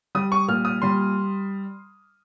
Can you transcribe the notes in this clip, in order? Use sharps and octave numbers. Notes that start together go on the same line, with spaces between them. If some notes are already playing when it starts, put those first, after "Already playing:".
G3 D#6
C#6
A#2 F6
D#6
G3 C6